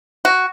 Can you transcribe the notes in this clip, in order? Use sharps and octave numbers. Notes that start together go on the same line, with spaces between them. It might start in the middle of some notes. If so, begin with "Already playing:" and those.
F#4